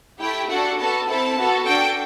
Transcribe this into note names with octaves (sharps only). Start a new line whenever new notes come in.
A3 E4 G4 G5
D4 F#4 A4 F#5
B3 F#4 A4 A5
C4 E4 A4 A5
B3 F#4 A4
D4 F#4 A4 G5